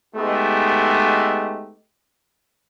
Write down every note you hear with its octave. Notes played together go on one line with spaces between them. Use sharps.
G#3 A3 B3 D#4 G4